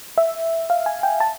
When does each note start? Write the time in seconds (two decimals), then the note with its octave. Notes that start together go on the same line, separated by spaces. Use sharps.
0.18 E5
0.70 F5
0.86 G#5
1.03 G5
1.20 A5